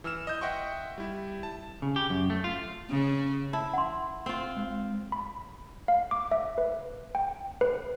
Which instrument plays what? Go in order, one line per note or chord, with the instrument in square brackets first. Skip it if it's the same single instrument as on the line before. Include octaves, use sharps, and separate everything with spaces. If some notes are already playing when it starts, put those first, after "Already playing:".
[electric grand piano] E3 E6 F6 E7
D#5 G6
D#5 E5 F#5 G5 C6 C#6
G3 E4
A5
[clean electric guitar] C#3
G4
F#2
A3
F4
[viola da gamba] C#3
[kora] E4 [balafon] A5
[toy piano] F#5 C6
[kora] C4 F4
[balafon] G#3
[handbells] B5
F5
D6
E5
B4
G5
B4